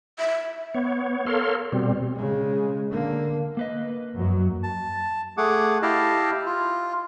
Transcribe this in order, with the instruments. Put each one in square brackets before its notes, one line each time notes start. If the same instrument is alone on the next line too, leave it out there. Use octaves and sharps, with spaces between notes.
[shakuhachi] E5
[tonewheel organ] B3 C#5
A4 A#4 C#5 F5 C6
B2 G3 C4
[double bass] C#3 G#3
D3 A#3
[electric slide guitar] A#3 B4 D#5
[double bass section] F#2 F#3
[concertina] A5
A3 G#4 F#5 D6
E4 G4 D#5 F5 A5
F4